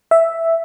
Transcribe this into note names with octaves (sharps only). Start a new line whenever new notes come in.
E5